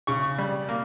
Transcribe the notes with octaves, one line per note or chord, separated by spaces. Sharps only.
C#3 C#6
G3
A#3